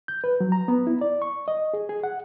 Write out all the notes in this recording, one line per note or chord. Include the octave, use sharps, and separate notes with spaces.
G6
B4
F#3
A#5
B3
E4
D5
C#6
D#5
G#4
G#4
F#5